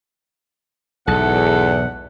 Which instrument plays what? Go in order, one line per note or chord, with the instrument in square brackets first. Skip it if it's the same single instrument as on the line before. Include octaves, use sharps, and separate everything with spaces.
[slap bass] B1 G#2 [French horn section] E2 [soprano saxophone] A4 [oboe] F#5